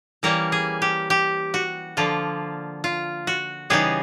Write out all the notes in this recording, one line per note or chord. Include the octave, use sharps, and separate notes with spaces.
E3 G3 A#3 C#4 A#4
G#4
G4
G4
F#4
D3 F3 A#3 F4
F4
F#4
C#3 E3 G3 B3 D#4 G#4